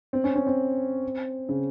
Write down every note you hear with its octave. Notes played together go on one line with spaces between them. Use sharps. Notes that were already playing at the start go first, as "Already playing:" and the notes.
C4
C#4
C#4
C4
C#3